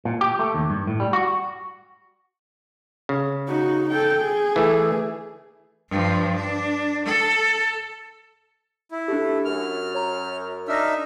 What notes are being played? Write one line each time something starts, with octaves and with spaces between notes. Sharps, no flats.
A#2
G4
A3
D#2
G2
A2
G3
F#4
C#3
D#4 F#4
A4 G5
G#4
E3 A3
G2 F3
D4
A4
E4
A3 D4 G4
F#2 F6
C#5 A#5
D4 D#4 E5 E6 F6 A#6